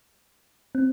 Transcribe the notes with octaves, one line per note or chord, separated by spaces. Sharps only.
C4